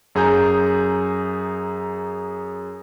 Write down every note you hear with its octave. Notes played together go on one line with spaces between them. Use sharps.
F#2 G#4 A#5 G6